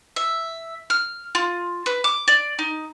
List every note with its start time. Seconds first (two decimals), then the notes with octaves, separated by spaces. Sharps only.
0.16 E5
0.90 F6
1.35 F4
1.86 B4
2.04 D6
2.28 D5
2.59 D#4